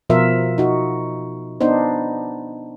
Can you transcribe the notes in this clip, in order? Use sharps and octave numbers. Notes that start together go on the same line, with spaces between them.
B2 F3 F4 A#4 E5
D#4 F#4
B3 D4 D#4 C5